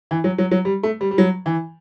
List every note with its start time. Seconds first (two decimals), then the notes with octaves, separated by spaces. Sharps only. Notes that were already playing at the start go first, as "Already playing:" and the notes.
0.11 E3
0.24 F#3
0.38 F#3
0.51 F#3
0.65 G3
0.83 A3
1.01 G3
1.11 G3
1.18 F#3
1.46 E3